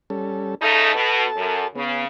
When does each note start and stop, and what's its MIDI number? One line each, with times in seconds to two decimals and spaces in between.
0.10 0.55 55
0.10 0.55 61
0.10 0.55 69
0.62 0.92 49
0.62 0.92 57
0.62 0.92 63
0.62 1.68 69
0.62 1.68 81
0.95 1.25 47
1.36 1.63 42
1.76 2.07 49
1.76 2.05 59